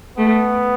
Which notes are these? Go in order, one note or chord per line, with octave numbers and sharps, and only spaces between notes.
A3 B3